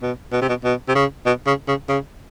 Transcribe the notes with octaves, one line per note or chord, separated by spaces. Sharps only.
B2
B2
C3
B2
B2
C3
C#3
B2
C#3
C#3
C#3